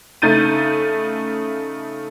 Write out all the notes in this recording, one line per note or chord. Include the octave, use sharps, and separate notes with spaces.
C#3 A3 D#4 G6 A6 D#7